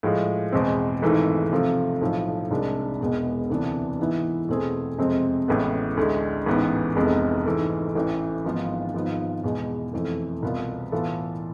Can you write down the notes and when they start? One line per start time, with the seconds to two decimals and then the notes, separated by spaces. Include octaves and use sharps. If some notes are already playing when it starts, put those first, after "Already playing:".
0.03 A2 F3 G#3
0.52 E2 B2 G#3 C4
1.02 G#1 G#2 E3 A3
1.52 C3 F3 A3
2.01 B1 A2 F3
2.51 C2 C3 G#3 D4
3.00 E1 E2 B2 G#3 B3
3.50 D2 C3 E3 B3 D4
3.99 G#2 E3 B3 E4
4.49 E2 B2 A3 C4 G#4
4.98 F2 C3 G#3 C4
5.48 A1 A2 G#3 B3
5.97 D2 D3 G#3
6.46 A1 G#2 E3 B3
6.96 F1 F2 C3 G#3 B3
7.46 G#2 E3 A3
7.95 A1 A2 E3
8.45 G#1 G#2 F3 B3 F4
8.94 G#1 G#2 F3 B3 F4
9.44 E2 B2 G#3
9.93 F2 E3 A3
10.42 C2 B2 B3 F4
10.92 A2 E3 B3 F4 A4